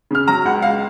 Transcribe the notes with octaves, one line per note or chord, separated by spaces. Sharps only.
C#3 F6
F#3 A#5
C#2 F#5
C#2 F5